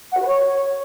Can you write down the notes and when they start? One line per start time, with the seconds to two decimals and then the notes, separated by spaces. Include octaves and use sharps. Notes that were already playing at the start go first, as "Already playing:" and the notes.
0.11 F#5
0.16 F#4
0.22 B4
0.27 C#5